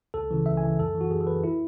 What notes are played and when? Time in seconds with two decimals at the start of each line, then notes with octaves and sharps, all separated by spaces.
0.14 C#2 A4
0.31 C#3 E3
0.46 C#2 E5
0.57 G#5
0.63 C#3 E3
0.79 F#2 A4
0.95 E3
1.01 F#4
1.11 F#2 G#4
1.21 A4
1.27 E3 B4
1.44 E4